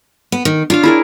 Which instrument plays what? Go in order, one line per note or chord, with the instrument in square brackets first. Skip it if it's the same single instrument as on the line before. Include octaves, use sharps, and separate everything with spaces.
[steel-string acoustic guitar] B3
D#3
[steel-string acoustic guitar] D4 [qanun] F4 C#5 F5
[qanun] E4 G#4 A#4